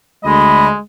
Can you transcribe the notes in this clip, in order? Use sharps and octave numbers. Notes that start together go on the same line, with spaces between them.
D2 G#3 D#5 B5